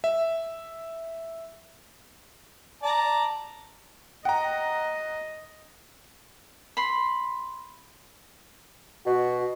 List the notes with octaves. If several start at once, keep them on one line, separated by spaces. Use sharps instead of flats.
E5
D5 A5 A#5
D#5 F#5 G5 A#5
B5 C6
B2 F#4